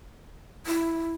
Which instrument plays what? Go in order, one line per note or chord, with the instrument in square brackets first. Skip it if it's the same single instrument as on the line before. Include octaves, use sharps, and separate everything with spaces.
[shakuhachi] E4